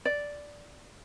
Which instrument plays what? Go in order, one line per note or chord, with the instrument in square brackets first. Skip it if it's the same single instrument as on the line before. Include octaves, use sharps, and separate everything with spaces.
[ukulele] D5